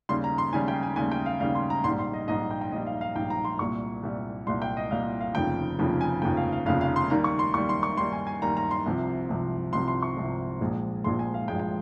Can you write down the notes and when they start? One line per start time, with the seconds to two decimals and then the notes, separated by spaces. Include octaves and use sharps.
0.09 D#2 C#3 G3 C6
0.24 A#5
0.38 C6
0.52 D#2 C#3 G3 G#5
0.68 G5
0.83 G#5
0.96 D#2 C#3 G3 G#5
1.12 G5
1.26 F5
1.40 D#2 C#3 G3 F5
1.55 C6
1.70 A#5
1.84 A#1 G#2 G3 C6
1.99 C6
2.14 D#5
2.28 A#1 G#2 G3 D#5
2.51 G5
2.61 G5
2.72 A#1 G#2 G3 D#5
2.86 F5
3.01 F5
3.15 A#1 G#2 G3 G5
3.30 A#5
3.45 C6
3.59 C2 A#2 G3 C#6
4.03 C2 A#2 G3
4.47 C2 A#2 G3 C6
4.62 G5
4.77 D#5
4.91 C2 A#2 G3 F5
5.21 F5
5.35 F1 D#2 C#3 F3 G5
5.79 F1 D#2 C#3 F3
6.01 G#5
6.22 F1 D#2 C#3 F3 G5
6.37 F5
6.52 F5
6.66 F1 D#2 C#3 F3 F5
6.81 F5
6.96 C6
7.10 D#2 D#3 G3 A#5
7.24 C#6
7.39 C6
7.54 D#2 D#3 G3 C#6
7.69 C6
7.83 C#6
7.97 D#2 D#3 G3 C6
8.12 G#5
8.27 G#5
8.42 D#2 D#3 G3 A#5
8.57 A#5
8.71 C6
8.86 C2 C3 F3
9.29 C2 C3 F3
9.73 C2 C3 F3 C6
9.88 C6
10.02 C#6
10.17 C2 C3 F3
10.61 A#1 A#2 F3 G#3
11.04 A#1 A#2 F3 G#3 C6
11.19 G#5
11.34 F5
11.48 A#1 A#2 F3 G#3 G5
11.59 G5